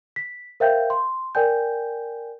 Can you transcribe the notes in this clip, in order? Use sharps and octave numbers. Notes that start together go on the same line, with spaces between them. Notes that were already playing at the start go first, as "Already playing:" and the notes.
B6
A#4 C5 E5 F5 G5 G6
C6
A#4 D5 G5 G#5 G6